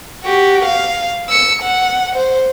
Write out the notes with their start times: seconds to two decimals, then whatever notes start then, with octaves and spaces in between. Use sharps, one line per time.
0.23 F#4 G4
0.65 F5
1.30 E6 C#7
1.62 F#5
2.16 C5